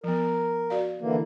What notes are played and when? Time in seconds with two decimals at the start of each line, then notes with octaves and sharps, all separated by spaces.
0.04 F3 B3 A#4
0.70 F#4 D5 F5
1.01 D3 E3 A#3